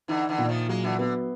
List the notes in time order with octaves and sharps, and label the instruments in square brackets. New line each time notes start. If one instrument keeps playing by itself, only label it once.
[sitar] D3 E3 [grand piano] D#4
[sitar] D3 E3
[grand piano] A#2
[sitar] D#3 F3
[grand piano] F#3 [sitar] G#3 A#3
[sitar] D3 E3
[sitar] D3 [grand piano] B3